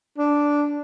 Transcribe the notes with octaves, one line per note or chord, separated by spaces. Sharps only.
D4